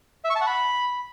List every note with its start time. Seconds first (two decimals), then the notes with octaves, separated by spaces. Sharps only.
0.24 E5
0.30 C#6
0.36 A5
0.41 F#5
0.47 B5